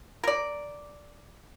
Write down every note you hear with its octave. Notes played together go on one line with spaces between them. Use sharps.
A#4 D5